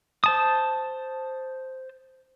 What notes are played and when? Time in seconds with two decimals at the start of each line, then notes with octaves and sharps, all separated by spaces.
0.24 C5 A5 D#6